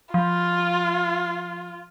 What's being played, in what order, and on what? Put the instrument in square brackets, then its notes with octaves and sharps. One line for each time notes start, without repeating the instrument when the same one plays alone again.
[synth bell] F3 [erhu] F4